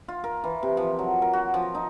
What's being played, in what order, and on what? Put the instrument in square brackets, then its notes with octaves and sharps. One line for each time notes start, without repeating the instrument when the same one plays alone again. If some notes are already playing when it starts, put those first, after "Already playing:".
[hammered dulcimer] F4
A#4
E3
C3
F3
F#3
A#4
F#4
F3
D#4